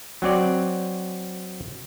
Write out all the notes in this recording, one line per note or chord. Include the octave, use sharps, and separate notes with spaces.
F#3 C4 D5